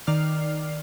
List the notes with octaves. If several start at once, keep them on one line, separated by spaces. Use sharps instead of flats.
D#3 D5 F6 C7